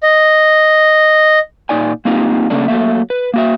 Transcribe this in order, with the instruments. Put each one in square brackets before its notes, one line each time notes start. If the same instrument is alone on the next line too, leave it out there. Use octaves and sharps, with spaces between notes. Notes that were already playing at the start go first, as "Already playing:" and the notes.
[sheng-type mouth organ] D#5
[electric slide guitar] A#2 F3 D#4 D5 G#5
A#3 C4 D#4 F4 G4
C#3 A3 A#3 C#4 D4
F#3 A3 A#3 E5
B4
A#3 F#4 E5